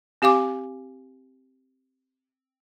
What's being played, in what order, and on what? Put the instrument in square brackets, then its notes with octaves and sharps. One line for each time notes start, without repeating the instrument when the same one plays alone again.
[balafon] C4 G4 F5 G#5 D6